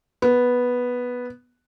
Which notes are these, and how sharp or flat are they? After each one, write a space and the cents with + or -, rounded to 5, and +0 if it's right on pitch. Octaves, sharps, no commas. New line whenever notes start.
B3 -5